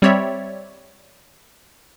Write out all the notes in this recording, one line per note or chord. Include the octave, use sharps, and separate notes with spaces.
G3 C4 C#5 D5 E5